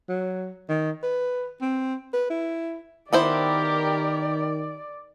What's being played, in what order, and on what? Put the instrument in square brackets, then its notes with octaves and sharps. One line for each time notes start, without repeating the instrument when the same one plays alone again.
[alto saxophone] F#3
D#3
B4
C4
B4
E4
[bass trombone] D#3 [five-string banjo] B3 E4 C5 [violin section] G4 A#4 [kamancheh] D5